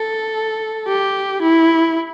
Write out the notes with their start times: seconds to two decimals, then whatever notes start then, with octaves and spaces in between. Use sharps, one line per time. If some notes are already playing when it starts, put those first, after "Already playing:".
Already playing: A4
0.88 G4
1.42 E4